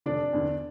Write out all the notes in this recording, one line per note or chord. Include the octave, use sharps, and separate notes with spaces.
F1 D4 D5
E2 D3